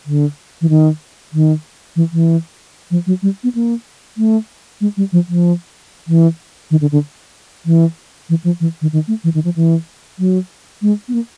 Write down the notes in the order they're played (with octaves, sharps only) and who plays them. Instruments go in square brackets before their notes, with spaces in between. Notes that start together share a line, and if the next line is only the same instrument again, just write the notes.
[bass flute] D3
E3
D#3
D#3
E3
E3
F3
F#3
G3
B3
A#3
A3
G#3
G3
F3
F3
E3
D#3
D3
D3
E3
E3
F3
E3
D#3
D#3
A3
E3
D#3
F3
E3
F#3
G#3
B3
A#3